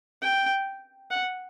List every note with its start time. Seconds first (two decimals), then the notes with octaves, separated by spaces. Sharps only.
0.22 G5
1.11 F#5